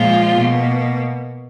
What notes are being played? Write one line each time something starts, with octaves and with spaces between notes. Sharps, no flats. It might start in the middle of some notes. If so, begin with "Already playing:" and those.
Already playing: A#2 F3 G#3 F4
B2 A#3